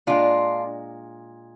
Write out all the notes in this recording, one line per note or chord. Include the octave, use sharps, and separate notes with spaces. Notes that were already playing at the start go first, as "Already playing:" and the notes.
A#2 G#3 D4 F4